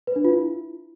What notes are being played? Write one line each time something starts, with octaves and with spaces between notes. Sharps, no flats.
B4
D4
F4
E4